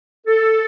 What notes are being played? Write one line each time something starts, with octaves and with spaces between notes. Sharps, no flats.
A4